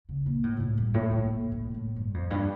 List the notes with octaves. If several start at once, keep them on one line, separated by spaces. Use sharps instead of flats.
C#3
A#2
A2
A#2
A2
G2
A2
A#2
A#2
A2
A2
G2
F2
G2